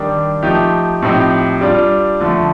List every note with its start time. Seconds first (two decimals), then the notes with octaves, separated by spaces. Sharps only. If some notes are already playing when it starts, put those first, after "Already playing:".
Already playing: D#3 G3 D4 G4
0.43 F3 A3 D#4 G4
1.02 A2 F3 C4 D#4 G4
1.61 G3 D4 F4
2.21 D3 F3 A3